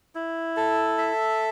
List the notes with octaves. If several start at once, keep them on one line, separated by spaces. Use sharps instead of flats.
E4
A4
E5